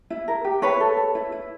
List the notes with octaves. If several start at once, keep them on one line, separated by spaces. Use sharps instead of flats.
E4
A#4
G4
E4 B4 C#5
A4
A4
E4
E4